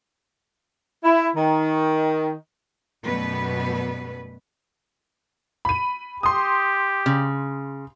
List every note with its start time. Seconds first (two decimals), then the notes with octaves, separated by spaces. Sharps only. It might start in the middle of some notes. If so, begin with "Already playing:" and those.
1.04 E4
1.36 D#3
3.03 F#2 B2 G3 A3 B3 B4
5.65 B5 D#7
6.23 G4 C6 D#6
7.06 C#3